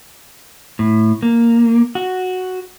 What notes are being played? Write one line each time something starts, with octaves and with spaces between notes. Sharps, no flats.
A2
A#3
F#4